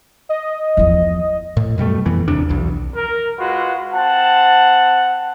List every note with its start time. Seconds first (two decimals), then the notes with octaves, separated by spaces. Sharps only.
0.29 D#5
0.77 E2 F3
1.57 A2
1.78 F#2 B2 G3 A3
2.06 F2 E3 B3
2.28 D#1 D#2 C3 D4
2.49 B1 E2
2.95 A#4
3.38 G#3 F4 F#4 B4
3.93 C4 F#5 A5